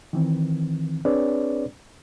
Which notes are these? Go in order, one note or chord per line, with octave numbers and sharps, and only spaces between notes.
D#3 E3 C4
C4 D4 G#4 B4 C#5 D5